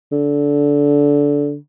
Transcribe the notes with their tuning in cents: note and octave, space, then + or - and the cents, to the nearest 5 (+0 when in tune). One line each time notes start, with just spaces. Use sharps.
D3 -20